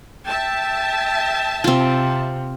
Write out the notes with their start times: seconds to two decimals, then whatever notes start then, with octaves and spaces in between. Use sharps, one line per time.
0.26 E5 G5 A5
1.64 C3 C4 F4